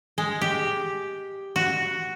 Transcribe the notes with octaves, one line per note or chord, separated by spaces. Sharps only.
G#3
G4
F#4